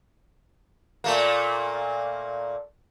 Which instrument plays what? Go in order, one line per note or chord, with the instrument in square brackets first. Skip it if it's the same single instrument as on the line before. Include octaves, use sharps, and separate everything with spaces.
[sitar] A#2 A3 A#3